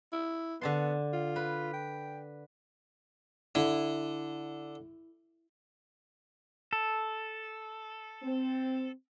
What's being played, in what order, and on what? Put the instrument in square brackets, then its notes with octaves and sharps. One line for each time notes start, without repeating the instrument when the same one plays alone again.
[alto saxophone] E4
[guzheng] D3 A5 C6 [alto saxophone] B3
[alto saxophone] F4
[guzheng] B4
[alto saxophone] G5
[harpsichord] D3 [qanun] E4
[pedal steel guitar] A4
[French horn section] C4